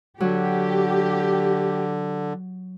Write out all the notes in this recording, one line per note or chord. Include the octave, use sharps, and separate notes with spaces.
D3 F#3 G4